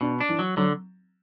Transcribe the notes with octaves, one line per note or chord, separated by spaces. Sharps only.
B2 D4
D4
E3
F#3
D3 F#3